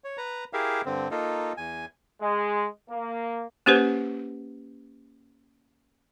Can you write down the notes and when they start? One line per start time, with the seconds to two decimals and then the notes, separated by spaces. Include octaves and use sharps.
0.04 C#5
0.18 B4 A#5
0.53 E4 G4 G#4 A#4 E5 F5
0.86 G2 D3 C4
1.11 A#3 D#4 F4 A4
1.57 E2 G#5
2.21 G#3
2.90 A#3
3.66 A#3 C#4 G4 B4 C5